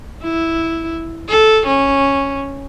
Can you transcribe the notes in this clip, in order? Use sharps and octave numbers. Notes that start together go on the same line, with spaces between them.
E4
A4
C#4